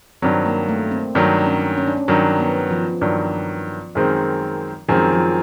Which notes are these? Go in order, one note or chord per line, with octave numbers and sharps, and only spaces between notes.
G2 D#3 F#3 C4
A#3
A3
C4
G2 D#3 F#3 D4
C#4
C#4
D4
C#4
G2 D#3 F#3
B3
F3
G2 D#3 F#3
F#2 D#3 G#3 C4
F#2 D#3 F3 G#3 C4
F3